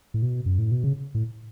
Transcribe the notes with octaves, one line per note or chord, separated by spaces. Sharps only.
A2
B2
F#2
A2
B2
C#3
A2